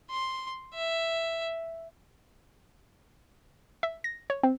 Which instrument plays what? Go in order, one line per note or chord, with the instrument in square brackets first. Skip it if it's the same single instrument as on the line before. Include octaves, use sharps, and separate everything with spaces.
[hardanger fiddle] C6
E5
[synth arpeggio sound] E5
A#6
C#5
C4